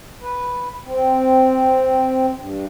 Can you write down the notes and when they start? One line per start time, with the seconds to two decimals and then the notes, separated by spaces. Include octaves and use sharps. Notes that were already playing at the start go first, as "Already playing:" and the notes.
0.22 B4
0.86 C4
2.37 G2